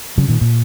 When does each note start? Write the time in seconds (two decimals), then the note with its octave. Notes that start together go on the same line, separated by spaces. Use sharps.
0.18 C#3 F#3
0.28 A#2 D#3
0.41 A#2